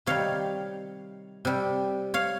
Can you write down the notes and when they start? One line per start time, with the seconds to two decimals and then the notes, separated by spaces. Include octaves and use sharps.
0.06 C3 D#3 G3 C#5 F5
1.45 C3 G3
2.14 C#5 F5